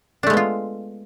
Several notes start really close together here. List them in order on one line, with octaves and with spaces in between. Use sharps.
D4 A3 G#3 B3 F4